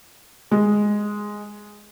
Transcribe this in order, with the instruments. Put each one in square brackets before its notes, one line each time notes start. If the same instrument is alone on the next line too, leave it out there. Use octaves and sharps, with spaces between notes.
[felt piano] G#3